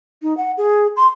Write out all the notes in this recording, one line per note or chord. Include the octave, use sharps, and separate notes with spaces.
D#4
F#5
G#4
C6